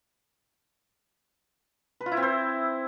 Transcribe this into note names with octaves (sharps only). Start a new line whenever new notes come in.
B4
F4
E4
C4
C5